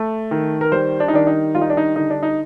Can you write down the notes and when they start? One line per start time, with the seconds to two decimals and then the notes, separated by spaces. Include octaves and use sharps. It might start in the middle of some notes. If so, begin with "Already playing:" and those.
Already playing: A3
0.31 D#3
0.61 A#4
0.72 G3 C5
1.00 D4
1.08 D#4
1.13 D#3 D4
1.27 D#4
1.55 G3 F4
1.61 D#4
1.70 D4
1.77 D#4
1.96 D3 D#4
2.10 D4
2.23 D#4